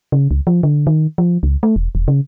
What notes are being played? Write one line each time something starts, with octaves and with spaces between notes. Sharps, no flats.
C#3
C#2
F3
D3
D#3
F3
C#2
A3
E1
E1
C#3